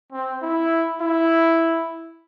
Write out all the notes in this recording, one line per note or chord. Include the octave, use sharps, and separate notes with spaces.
C4
E4
E4